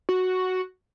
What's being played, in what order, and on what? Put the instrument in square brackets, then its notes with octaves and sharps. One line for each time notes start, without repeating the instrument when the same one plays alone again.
[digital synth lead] F#4